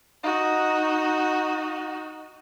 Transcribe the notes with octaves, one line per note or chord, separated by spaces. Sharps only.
D#4 F#4